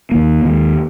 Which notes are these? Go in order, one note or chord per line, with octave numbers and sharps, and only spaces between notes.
D#2 D#3 A#3
D#2 D#3 G#3